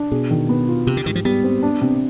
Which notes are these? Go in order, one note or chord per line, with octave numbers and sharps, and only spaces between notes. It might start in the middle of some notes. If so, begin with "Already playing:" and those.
Already playing: D4
B2 G#4
D#3
B3
F4
C3 G4
D3
G#2 D#3
F3
G3 B3
C4
D4
C3